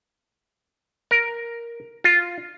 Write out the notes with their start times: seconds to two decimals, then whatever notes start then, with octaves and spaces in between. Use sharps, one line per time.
1.11 A#4
2.04 F4